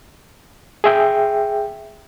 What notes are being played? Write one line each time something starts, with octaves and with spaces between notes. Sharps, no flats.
G#4 E5 G5